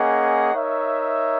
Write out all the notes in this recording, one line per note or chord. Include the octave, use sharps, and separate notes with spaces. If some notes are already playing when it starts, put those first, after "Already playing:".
Already playing: A#3 C#4 G#4 D#5 F#5
D#4 A#4 C#5 E5